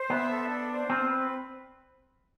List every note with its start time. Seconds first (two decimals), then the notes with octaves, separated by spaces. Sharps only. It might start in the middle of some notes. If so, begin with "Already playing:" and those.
Already playing: C5
0.09 B3 E5
0.30 A4
0.49 D4
0.70 C5
0.90 C4 F4
1.10 B4